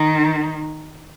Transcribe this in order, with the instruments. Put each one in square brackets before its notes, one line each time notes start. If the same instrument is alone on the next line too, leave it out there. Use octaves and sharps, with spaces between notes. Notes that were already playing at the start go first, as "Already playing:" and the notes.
Already playing: [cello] D#3